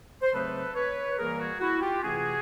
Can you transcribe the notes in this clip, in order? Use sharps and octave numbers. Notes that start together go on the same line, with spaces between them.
C5
C#3 F#3 A3 C4 D#4 A4 B4
B4 C#5
B4
E3 G3 A#3 G#4 A#4
F#4 G#4
E4 F#4
F4 G4
C3 E3 A3 C#4 F#4 G#4